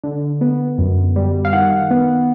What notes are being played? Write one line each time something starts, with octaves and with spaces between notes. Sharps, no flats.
D3
B3
F#2
G3
F5
D#3 F#5
B3